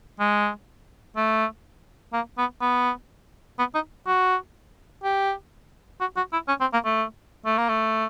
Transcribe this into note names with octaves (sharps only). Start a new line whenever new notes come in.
G#3
A3
A#3
B3
B3
B3
D#4
F#4
G4
F#4
F#4
E4
C#4
C4
A#3
A3
A3
A#3
A3